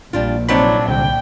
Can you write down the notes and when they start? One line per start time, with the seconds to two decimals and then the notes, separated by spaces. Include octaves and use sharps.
0.13 A#1 G3 D4 F4
0.49 C3 F#3 C4 D4 D#4 C#5 B5
0.89 C2 D3 G5